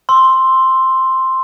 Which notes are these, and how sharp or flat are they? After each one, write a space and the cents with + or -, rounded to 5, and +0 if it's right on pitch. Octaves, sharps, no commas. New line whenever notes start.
C6 +0 E6 +0